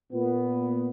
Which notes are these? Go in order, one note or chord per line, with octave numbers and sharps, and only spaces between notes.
A#2 B3